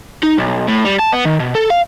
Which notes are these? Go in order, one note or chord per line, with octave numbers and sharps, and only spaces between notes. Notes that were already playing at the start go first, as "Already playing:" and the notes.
D#4
B1
A2
G3
A5
B3
D#3
B2
A4
F5